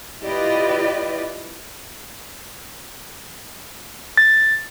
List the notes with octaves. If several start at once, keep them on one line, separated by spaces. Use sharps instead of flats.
E4 F4 G4 B4 D5 D#5
A6